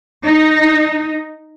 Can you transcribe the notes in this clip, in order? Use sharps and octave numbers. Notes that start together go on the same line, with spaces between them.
D#4